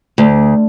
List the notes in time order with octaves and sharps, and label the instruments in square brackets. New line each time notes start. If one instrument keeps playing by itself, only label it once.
[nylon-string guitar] D2